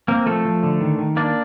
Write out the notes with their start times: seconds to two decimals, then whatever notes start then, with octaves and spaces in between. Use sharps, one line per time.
0.08 A#3 C4 A#4
0.26 F3 A3 A4
0.45 F3
0.63 D3
0.81 D#3
0.98 D#3
1.16 A#3 D4 D5